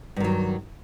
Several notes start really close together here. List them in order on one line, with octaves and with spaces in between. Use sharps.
G2 D#3 F#3